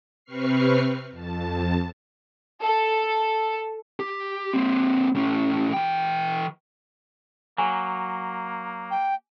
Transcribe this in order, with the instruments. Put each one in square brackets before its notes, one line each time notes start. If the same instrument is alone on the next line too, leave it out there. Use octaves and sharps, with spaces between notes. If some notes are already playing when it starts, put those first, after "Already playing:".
[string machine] C3 C4 B4 C#6 F6 C7
F2 A5
[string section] A4
[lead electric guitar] G4
A#3 C4
A2 C#4
E3 G5
[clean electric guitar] F#3 [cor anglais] A#3 [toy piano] G#5
[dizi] G5